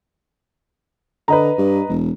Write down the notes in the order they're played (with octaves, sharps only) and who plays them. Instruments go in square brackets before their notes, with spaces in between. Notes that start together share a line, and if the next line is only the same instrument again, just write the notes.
[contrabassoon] D3 [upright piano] B4 D#5 A#5
[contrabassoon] G2
E1